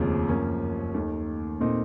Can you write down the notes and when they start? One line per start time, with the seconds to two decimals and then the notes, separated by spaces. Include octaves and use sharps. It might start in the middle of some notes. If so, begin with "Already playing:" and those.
Already playing: F1 D#2 C#3 F3 C4
0.29 F#2 F3 A#3 C#4
0.94 D#2 D#3 A3
1.60 A#2 A3 C4 D#4